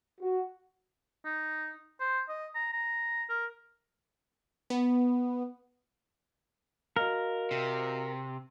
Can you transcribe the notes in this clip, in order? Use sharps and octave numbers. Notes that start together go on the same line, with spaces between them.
F#4
D#4
C5
D#5
A#5
A#5
A#4
B3
F#4 A#4 D#5 F5
C3